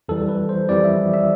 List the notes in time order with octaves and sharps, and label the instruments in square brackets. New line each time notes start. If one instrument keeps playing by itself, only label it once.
[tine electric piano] F2 E3 G3 A4
B4
C5
F2 E3 G3 D5
E5
E5